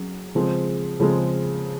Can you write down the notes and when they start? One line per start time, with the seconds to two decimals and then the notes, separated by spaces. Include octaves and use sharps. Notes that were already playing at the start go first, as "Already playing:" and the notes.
Already playing: F#3 C#4 G#4
0.35 C#3 F3 G#3 C4
1.00 C#3 F3 G#3 C4